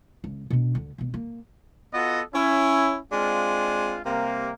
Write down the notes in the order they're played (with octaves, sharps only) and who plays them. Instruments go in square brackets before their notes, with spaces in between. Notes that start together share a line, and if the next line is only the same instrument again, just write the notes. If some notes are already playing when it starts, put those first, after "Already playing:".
[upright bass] C#2
B2 D4
D2 D3
B2 B3
A#3
[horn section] B3 F4 F#4 A4 D#5
C#4 E4
G#3 C4 D4 F4
C3 G3 A#3